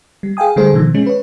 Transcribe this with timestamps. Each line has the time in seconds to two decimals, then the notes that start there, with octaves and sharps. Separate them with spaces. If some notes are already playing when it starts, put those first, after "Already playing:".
0.23 G3
0.37 G#4 F5 G5 G#5 D#6
0.56 D3 G3 A3 G#4 A4 C5
0.73 B2 D#3 F3
0.94 G#3 C#4
1.06 B4 C#5